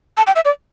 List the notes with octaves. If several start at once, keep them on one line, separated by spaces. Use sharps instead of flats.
A5
G5
E5
D5